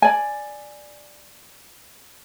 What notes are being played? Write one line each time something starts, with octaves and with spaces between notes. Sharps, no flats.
D5 G#5